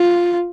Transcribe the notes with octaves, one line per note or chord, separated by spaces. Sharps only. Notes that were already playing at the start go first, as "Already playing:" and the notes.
Already playing: F4